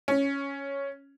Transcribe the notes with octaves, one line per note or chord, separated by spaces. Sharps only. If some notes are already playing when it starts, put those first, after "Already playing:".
C#4